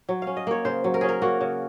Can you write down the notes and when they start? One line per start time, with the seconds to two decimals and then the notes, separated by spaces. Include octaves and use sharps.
0.09 F#3
0.22 C#4 F5
0.37 D#5
0.47 A#3 C#5
0.65 C#3 C5
0.84 F#3
0.94 A#4
1.01 C#4 G#4
1.09 A#4
1.22 A#3 F#4
1.41 C#3